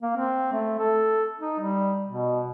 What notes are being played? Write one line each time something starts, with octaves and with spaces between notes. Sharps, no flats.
A#3
C4
A3
A4
D#4
G3
B2